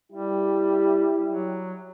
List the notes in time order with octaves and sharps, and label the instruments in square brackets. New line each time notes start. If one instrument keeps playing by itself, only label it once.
[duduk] G3 [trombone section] E4 G4
[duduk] F#3